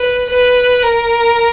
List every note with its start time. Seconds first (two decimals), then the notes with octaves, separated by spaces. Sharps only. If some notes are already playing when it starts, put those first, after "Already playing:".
Already playing: B4
0.30 B4
0.83 A#4